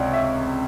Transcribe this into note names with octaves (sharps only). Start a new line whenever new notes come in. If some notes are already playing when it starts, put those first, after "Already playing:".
Already playing: C#2 C3 C#5 D5
E5